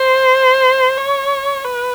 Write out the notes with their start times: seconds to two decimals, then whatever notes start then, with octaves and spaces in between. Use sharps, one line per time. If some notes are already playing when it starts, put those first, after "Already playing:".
Already playing: C5
0.97 C#5
1.65 B4